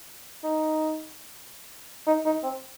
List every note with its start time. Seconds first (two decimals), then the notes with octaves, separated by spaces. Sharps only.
0.44 D#4
2.07 D#4
2.25 D#4
2.43 C4